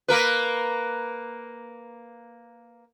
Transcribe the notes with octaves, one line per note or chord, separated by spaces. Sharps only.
A#3 A#4 B4